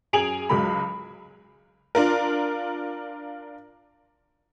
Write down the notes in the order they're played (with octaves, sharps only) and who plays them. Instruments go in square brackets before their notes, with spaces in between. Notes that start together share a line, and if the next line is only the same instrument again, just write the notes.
[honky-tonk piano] F#2 G#4 G#5 D7 F7 F#7
C#2 F#3 G#3 B5
D4 F4 A#4